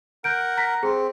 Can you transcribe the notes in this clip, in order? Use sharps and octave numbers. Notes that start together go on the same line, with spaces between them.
A#4 F#5 G6 D7
A#5 A#6 B6
C4 G#4